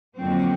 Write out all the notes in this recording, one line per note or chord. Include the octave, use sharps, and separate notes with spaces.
F2 D3 F#3 A#3 C4